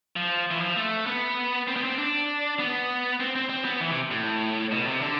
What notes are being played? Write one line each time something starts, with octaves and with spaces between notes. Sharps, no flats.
F3
E3
F3
A3
B3
C4
B3
C4
D4
B3
C4
C4
C4
B3
E3
C3
A2
B2
C3
D3